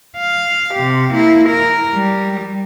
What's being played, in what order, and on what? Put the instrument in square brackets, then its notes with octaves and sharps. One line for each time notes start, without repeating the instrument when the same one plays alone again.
[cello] F5
C3 G4
A#3 E4
A#4
G3